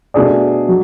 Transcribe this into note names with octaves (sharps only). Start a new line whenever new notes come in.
B2 A3 D4 G#4 D5
F#3